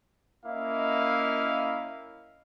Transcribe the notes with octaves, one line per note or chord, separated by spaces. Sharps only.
A#3 C#4 E4 D#5 F5